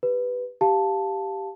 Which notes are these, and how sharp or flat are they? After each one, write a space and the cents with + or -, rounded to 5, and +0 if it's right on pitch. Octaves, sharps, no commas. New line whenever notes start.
G4 +0 B4 +0
G4 +0 F5 +0 A5 +0